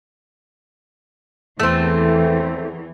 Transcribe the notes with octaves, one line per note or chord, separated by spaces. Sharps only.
E2 E3 A3 C4